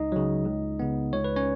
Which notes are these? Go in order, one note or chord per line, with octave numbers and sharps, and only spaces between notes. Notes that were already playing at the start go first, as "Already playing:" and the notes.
Already playing: C#2 D#4 D#5
C#3 F#3
C#2
C#3 B3
C#2 C#5
B4
C#4 C#5